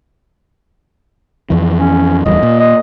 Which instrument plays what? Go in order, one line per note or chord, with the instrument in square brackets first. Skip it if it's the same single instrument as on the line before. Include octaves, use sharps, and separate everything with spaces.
[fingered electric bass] F2 E3
[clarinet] C#4
[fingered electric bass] D1 E2 G3 [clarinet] D#5
[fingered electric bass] A#2
[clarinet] D#5